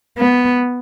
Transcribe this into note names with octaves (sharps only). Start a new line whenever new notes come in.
B3